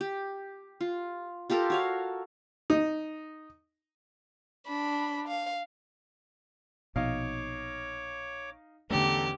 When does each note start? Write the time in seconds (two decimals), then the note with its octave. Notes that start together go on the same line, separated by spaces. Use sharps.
0.01 G4
0.81 F4
1.50 F4 G4 A4 A#4
1.70 F#4 C#5 F5
2.70 D#4
4.67 D4 B5
5.28 F5
6.96 A#1 B2 D#4 C#5 F5 D6
8.90 A1 E2 D3 A3 G4 A4 A#5